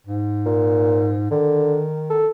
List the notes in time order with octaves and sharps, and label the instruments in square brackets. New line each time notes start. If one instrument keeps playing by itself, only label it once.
[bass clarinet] G#2
[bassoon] A#2
[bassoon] D3 [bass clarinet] D#3
[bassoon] A4